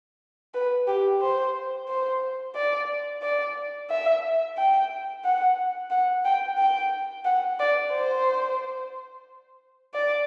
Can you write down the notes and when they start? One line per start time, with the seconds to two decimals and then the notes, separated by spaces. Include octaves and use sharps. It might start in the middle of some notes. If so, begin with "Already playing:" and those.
0.54 B4
0.87 G4
1.21 C5
1.88 C5
2.55 D5
3.22 D5
3.90 E5
4.57 G5
5.24 F#5
5.90 F#5
6.24 G5
6.58 G5
7.25 F#5
7.59 D5
7.93 C5
9.94 D5